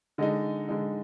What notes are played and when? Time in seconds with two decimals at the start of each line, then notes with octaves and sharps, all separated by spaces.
0.18 D3 G#3 D#4 D#5
0.68 D3 G#3 D#4